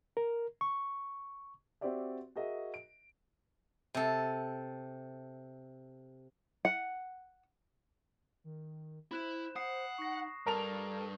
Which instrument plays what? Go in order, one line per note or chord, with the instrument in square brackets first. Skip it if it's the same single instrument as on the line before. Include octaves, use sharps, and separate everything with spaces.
[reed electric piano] A#4
C#6
[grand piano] C4 F#4 G4 D5 E5
F#4 G#4 A#4 D#5 E5
D7
[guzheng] C3 A4
[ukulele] F#5
[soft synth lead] D#3
[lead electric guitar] E4 [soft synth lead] C5 [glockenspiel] B5 F#6 E7
[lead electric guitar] F#5 [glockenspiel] D#6 C7
[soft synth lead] D#4 [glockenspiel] C#6 A#6
[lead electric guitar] G2 [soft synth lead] A4 [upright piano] A#4 A5 F7